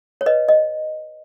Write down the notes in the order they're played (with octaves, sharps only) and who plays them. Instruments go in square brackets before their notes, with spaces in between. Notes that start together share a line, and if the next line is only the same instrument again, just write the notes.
[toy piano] C#5
B4 D#5
D#5